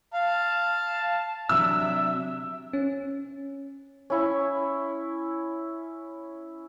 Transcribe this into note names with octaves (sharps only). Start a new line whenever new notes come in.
F5 A5
C3 F#3 D4 E5 E6
C#4
C#4 E4 C#6